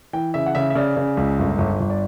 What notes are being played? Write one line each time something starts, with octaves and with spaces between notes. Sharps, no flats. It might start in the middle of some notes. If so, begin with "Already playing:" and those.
E3 G5
C#3 E5
F#5
C#3 E5
E5
C#3 D5
C#3
C#2
G1
G1
G1
D5